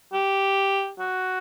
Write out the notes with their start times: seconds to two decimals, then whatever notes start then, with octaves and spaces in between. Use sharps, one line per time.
0.13 G4
0.99 F#4